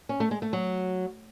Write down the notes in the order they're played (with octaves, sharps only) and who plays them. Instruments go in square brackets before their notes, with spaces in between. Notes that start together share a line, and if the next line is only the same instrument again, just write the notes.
[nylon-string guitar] C#4
A3
G#3
A3
F#3